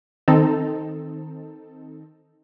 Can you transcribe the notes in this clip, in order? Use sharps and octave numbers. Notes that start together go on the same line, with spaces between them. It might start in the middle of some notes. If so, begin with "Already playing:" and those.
D#3 C4 D#4 A4